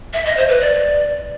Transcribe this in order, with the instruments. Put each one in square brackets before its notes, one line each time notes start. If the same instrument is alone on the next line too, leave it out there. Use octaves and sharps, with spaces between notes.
[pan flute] E5
D#5
C5
B4
D5